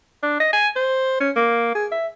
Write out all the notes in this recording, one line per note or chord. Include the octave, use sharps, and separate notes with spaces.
D4
D#5
G#5
C5
C#4
A#3
G#4
E5